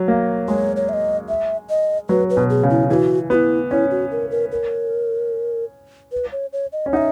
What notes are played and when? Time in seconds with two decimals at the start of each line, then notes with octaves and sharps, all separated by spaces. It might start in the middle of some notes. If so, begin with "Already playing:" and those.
Already playing: F#3
0.08 A#3
0.48 G#3 C#5
0.76 C#5
0.89 E5
0.93 D#5
1.29 E5
1.70 D#5
2.09 F#3 B4
2.30 B4
2.37 B2
2.50 G#4
2.63 C#3
2.70 E4
2.90 E3 F#4 G#4
3.30 B3 F#4
3.35 E4
3.71 C#4 E4
3.91 F#4
4.11 A#4
4.31 A#4
4.52 A#4
6.12 B4
6.32 C#5
6.53 C#5
6.72 D#5
6.86 C#4
6.93 D#4 E5 F#5